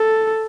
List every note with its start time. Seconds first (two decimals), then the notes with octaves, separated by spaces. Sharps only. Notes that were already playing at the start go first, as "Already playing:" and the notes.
Already playing: A4